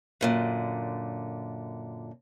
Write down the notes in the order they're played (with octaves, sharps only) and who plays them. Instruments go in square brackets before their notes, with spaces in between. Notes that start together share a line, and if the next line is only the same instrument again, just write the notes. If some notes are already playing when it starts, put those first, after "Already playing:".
[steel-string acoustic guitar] F#2 A#2 D3